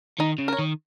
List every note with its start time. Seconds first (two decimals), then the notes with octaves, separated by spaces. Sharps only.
0.19 D#3 D#4
0.39 C#3
0.48 A#4 C#5
0.59 D#3